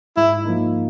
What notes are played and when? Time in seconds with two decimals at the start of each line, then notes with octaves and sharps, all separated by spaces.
0.17 G#2 E4
0.44 F3 A#3 D#4